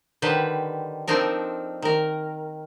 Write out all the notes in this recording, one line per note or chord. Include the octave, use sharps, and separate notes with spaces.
D3 D#3 G3 B4 C5
F3 C4 D4 D#4 A4 A#4
D#3 A#4